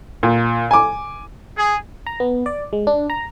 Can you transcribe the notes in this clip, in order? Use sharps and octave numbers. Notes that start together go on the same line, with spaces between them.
A#2
G#5 D6
G#4
A#5
B3
D5
G#3
D4
A#5